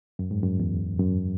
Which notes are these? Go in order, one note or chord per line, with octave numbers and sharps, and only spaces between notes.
F#2
G#2
F#2
E2
F#2